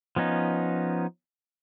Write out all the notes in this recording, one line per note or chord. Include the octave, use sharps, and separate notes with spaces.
F3 B3 C#4 D#4